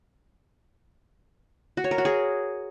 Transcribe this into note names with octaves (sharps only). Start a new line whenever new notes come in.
F#4
C#5
A#4
F#4
G#4